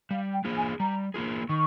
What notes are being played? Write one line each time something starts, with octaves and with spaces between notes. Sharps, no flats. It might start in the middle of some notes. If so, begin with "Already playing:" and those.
G3 F5
G5
A#3 F4 G#4
G#5
G3 A#5
A#3 F4 G#4
D#3 C#6